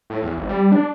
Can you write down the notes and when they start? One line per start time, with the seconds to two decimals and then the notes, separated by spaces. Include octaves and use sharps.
0.10 A2
0.23 E2
0.37 G#1
0.49 G3
0.72 D4